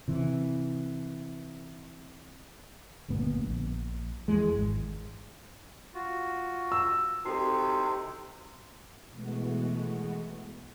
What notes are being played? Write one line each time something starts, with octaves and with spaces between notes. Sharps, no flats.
C3 E3
G1 D2 A#2 B3
A#1
F2 E3 G#3
G#1
F4 F#4
E6
C3 D#4 F#4 A4
B2 E3 G#3 A3 B3 F#4